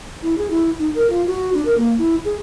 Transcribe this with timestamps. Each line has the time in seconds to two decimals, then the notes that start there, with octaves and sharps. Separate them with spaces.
0.23 E4
0.38 G#4
0.50 E4
0.79 D#4
0.95 A#4
1.10 F4
1.27 F#4
1.54 D4
1.65 A#4
1.78 A#3
1.98 E4
2.25 G#4